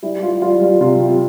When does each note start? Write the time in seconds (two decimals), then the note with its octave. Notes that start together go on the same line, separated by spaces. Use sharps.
0.03 G3 E4
0.23 G3 F4
0.42 G3 F4
0.61 G3
0.81 C3 F4
1.00 G3